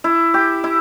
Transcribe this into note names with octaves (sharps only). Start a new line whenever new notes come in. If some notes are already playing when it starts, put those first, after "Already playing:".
E4
G4
E4